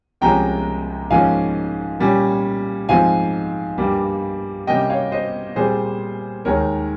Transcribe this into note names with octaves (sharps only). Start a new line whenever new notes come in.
C2 C3 F3 G#3 C#4 G5 A#5
G#2 F3 A#3 C#4 F5 G#5
A#2 G3 C#4
G#2 F3 C4 F5 G#5
G2 G3 A#3
C3 G3 A#3 C#4 D#5 G5
C#5 F5
C5 D#5
A#2 G3 C4 G#4 C5
D#2 D#3 G#3 A#4 C#5